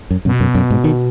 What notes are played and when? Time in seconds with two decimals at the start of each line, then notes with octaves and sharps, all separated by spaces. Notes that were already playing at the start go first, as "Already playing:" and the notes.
0.11 F#2
0.25 F#2 B2
0.40 F#2
0.55 F#2
0.70 G#2
0.84 D#3